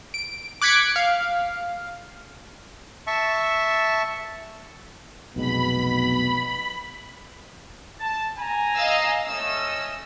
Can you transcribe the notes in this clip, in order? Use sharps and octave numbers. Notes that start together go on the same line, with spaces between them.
D7
D6 F#6 G#6 B6 C#7 D7
F5
E5 A5 C#6
F1 B1 B2 G#3 B5
A5
G#5 A#5
D#5 F5 E6
A3 C#4 D#5 E6